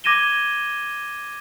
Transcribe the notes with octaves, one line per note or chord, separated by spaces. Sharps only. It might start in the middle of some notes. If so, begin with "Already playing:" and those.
D6 G#6 A#6 D#7 E7 G7